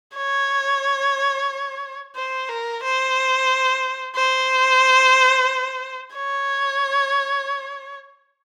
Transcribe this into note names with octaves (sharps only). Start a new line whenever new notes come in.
C#5
C5
A#4
C5
C5
C#5